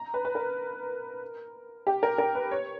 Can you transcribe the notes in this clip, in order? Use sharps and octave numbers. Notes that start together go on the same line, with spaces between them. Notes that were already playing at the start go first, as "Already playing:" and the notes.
Already playing: A#5
B4
B4
A#4
G4
A#4
A#4
B4
C#5